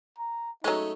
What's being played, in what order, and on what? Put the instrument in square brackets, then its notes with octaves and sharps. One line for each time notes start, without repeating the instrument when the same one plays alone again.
[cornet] A#5
[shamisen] F#3 G#3 [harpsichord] A3 C#4 D#5 [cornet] D#4